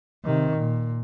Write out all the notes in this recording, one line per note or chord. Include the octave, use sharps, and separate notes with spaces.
C3 D#3
A#2